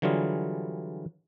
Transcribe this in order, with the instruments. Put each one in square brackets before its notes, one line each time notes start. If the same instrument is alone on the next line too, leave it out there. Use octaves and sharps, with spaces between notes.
[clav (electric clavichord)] D3 E3 F#3 G3 F4 G#4